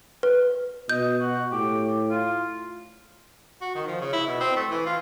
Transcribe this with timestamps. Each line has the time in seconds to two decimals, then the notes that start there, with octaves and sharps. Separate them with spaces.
0.23 B4
0.89 B2 D#5 G6
1.20 F#4
1.52 A2 G4
2.11 F4
3.61 F#4
3.75 D#3
3.87 F3
4.01 C#3
4.13 E4
4.27 B2
4.40 C4
4.56 A3
4.70 E3
4.86 F4